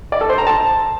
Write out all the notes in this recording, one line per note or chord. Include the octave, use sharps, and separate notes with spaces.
D5
A4
C5
A#5
A5